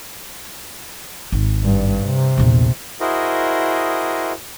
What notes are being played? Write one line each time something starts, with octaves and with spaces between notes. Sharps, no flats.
G#1
G2
C3
A#1 E2
E4 F#4 G#4 A#4 C5 D#5